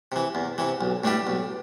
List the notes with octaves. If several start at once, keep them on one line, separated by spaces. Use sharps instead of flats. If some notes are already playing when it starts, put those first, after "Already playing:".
C3 E3
E2
C3 E3
B1
A2 G3 D4 G4
B1